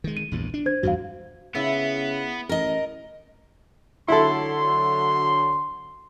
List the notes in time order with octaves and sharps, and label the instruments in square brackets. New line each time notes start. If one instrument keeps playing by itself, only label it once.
[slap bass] D#3 G#3
[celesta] D#7
[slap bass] A#1 E2 G2
D4
[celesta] C5 G#6
[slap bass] E2 G2 [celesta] F#4 F5
[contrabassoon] C#3 [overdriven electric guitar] B3 [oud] E4
[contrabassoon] A1 [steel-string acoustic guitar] A#4 D#5
[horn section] D3 F#3 C6 [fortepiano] E4 A4